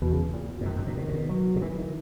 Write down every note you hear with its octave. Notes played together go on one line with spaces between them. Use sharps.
E2 B2
C#3
A#2
B2
G#2
F#2 D#3
F#2
A#2
B2
A#2
B2
F#3
B2
A#2 E3
D#3